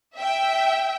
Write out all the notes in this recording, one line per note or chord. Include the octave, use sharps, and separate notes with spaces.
E5 G5